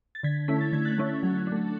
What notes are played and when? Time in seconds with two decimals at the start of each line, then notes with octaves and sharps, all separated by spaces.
0.15 A6
0.23 D3 G#6 B6
0.48 A3 C#4 E4 B6
0.61 A6
0.72 D3 G#6
0.85 F#6 A6
0.98 A3 C#4 E4
1.23 F#3
1.47 D4
1.52 A3